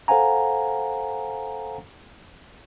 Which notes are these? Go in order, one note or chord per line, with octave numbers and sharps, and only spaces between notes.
A4 C5 F5 F#5 G#5 A#5